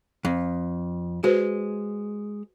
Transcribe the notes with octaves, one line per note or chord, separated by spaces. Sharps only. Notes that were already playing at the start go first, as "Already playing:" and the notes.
F2
G#3 F#4 B4 C5